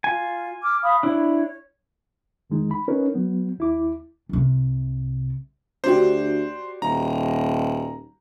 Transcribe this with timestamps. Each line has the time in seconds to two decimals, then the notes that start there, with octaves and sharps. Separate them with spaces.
0.04 F4 G#5
0.62 D6 F6
0.82 F5 B5 D#6
1.03 D4 E4 C#5
2.50 F2 D#3 G#3 D#4
2.71 B5
2.88 C#4 D#4 A#4 B4 C#5
3.15 F#3 B3
3.58 D#2 E4 D6
4.29 C2 C3
5.84 D2 D4 F#4 G4 C5
6.82 D#1 A#5